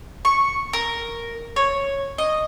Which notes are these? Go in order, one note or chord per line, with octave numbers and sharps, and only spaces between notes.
C#6
A#4
C#5
D#5